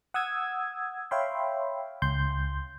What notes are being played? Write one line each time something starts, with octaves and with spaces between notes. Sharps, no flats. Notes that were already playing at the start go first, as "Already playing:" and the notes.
F#5 D#6 E6 G#6
C#5 E5 F5 G5 B5 C6
C#2 C6 G6